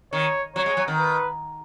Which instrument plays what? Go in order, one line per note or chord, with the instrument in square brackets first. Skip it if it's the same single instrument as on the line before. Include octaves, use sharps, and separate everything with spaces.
[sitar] D#3 [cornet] C#5
[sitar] F#3 [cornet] C#5
[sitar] G#3
F#3
D#3
[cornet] B4